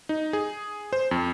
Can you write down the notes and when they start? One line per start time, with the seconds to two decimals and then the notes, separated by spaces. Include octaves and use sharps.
0.09 D#4
0.33 G#4
0.93 C5
1.11 F2